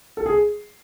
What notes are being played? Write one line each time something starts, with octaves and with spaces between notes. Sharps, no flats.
A4
G#4